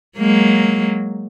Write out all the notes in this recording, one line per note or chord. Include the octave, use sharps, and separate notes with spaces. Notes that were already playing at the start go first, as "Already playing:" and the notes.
F#3 G#3 A#3